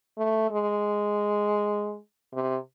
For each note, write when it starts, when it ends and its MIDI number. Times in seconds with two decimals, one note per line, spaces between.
0.17 0.46 57
0.51 1.97 56
2.33 2.57 48